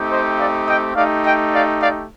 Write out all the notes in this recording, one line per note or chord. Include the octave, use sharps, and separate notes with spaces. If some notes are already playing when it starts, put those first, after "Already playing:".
Already playing: A3 C4 D#4 G4
C5 D#5
D5 F5
D#5 G5
A3 D#4 G4 D5 F5
D#5 G5
D5 F5
D5 F5